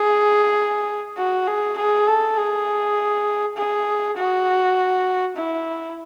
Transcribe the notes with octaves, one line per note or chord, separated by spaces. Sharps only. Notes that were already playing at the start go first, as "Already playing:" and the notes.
Already playing: G#4
F#4
G#4
G#4
A4
G#4
G#4
F#4
E4